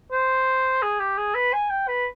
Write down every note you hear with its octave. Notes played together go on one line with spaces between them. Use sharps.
C5
G#4
G4
G#4
B4
G#5
G5
B4